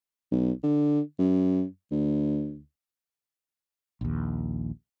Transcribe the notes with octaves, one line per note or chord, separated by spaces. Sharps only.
B1
D3
F#2
D2
A#1 D#2